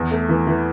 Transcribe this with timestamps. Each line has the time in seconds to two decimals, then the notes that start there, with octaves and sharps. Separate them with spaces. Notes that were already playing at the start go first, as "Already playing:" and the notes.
Already playing: E2
0.11 A3
0.29 E3
0.47 E3